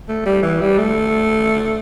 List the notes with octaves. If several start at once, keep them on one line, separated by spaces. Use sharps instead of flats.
A3
G3
E3
G3
A3